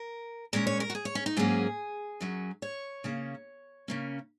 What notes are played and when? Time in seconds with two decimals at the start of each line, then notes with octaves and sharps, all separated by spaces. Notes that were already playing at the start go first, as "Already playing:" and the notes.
Already playing: A#4
0.53 A#2 G#3 C#4 A#4
0.67 C#5
0.80 A#4
0.90 F#4
0.95 G#4
1.05 C#5
1.15 C#4
1.26 D#4
1.37 G#2 F#3 A#3 C#4 G#4
2.21 F#2 F#3 C#4
2.62 C#5
3.04 C#3 A#3 C#4
3.88 C#3 A#3 C#4